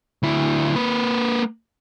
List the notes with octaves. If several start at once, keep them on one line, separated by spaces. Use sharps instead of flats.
D2 E4
A#3 B4